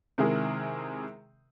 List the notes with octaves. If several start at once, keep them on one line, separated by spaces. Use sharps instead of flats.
C3 D#3 G#3 E4 G#4 A#4